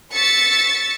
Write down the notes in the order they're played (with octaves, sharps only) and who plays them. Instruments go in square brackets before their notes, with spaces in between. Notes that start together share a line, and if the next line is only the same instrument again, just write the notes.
[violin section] C#6 E6 A6 B6 C#7